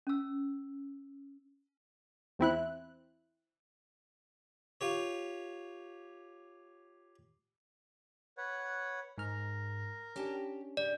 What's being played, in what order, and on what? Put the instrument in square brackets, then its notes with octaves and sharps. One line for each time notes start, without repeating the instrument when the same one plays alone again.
[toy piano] C#4 E6
[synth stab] E2 C4 E4 F#6
[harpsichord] F4 G4 C#5
[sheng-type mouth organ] B4 C#5 F#5
[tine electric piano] G#2 F6 [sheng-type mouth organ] A#4
[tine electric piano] C#4 D4 [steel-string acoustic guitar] G4 G5 A5
[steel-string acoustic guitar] C#3 G4 [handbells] D5